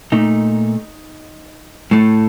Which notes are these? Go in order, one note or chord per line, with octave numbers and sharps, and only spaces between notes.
A#2 A3 D#4
A2 A3